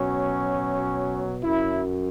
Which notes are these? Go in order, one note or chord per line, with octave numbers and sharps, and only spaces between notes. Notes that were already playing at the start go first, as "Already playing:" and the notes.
Already playing: B2 F#3 C#4
F#2 F#3 E4